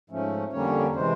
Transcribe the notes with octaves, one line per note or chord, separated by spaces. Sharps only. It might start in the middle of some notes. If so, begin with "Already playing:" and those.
G#2 F3 A3 C#4
F2 D3 G3 A#3 C#4 C#5
C3 E3 G#3 C5